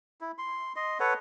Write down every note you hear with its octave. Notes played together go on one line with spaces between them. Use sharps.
E4
C6
D#5 C6
A4 B4 C#5 F#5